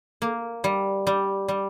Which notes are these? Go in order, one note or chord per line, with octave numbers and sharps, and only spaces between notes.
A#3
G3
G3
G3